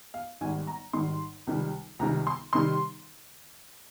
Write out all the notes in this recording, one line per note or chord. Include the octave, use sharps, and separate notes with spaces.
F5
G#1 G#2 D#3 G3 G#5
A#5
G#1 G#2 D#3 G3 C6
C#2 C3 D#3 G3
C#2 C3 D#3 G3 A#5
C6
C3 D#3 G3 C6